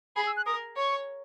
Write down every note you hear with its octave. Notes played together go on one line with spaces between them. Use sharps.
G#4 B5
E6
F#6
A#4 D#6
C#5 C#6